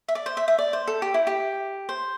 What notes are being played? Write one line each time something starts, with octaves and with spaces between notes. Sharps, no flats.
E5
D5
C5
E5
E5
D5
C5
A4
G4
E4
G4
C5